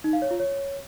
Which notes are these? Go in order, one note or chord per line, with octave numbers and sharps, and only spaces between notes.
D#4
F5
C#5
F4
C#5